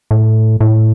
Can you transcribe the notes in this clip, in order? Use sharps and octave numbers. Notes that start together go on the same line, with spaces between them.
A2
A2